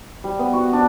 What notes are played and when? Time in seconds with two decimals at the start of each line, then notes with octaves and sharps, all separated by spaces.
0.24 G3
0.39 B3
0.53 F#4
0.73 D4